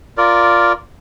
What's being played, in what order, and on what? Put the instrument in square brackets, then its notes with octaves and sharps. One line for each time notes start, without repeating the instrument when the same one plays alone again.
[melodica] F4 A#4 D5